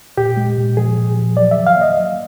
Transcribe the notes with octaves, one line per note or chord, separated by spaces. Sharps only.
A#2 G4
G#3
A#2
F3 G#4
A#2
F3
F#3 D5
D#3 E5
F5
A#3 D#5
F#3